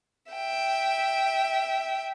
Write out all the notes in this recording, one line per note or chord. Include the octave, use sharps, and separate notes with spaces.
E5 G5